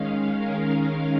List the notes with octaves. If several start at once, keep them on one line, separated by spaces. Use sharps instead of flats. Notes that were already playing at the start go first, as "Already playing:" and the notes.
Already playing: D#3 G#3 C#4 F5
A#4